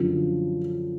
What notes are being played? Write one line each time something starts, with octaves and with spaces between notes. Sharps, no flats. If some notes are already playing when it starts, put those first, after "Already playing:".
Already playing: F#2 D3 F3